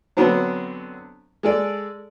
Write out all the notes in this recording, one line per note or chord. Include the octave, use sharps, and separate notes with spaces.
D3 F#3 B3 C4 D4
G#3 A4 D5